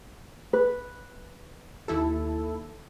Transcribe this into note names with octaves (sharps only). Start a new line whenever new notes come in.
B4
D#2 E4 A4